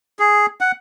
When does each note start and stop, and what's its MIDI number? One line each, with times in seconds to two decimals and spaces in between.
0.19 0.46 68
0.61 0.72 78